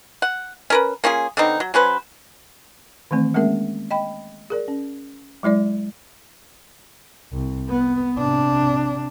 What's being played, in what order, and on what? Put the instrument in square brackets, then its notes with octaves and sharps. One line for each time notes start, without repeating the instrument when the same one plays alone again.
[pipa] F#5
C#4 A#4 B4
A#3 C#4 F4 G#4
D3 B3 C4 D#4
F#3
F#3 C#4 B4 C5
[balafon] D#3 E3 A3 C4
G#3 A#3 C#4 G#4 A#4 E5
D#5 G5 B5
G#4 A#4 D5
C#4
F#3 G#3 E4 D5
[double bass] C2
B3
C3 D4